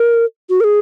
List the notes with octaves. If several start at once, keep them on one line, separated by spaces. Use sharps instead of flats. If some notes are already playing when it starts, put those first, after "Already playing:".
Already playing: A#4
F#4
A#4
G#4